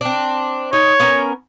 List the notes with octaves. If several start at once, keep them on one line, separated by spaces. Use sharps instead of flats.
C4 D4
D#4 C#5
B3 C#4 A#4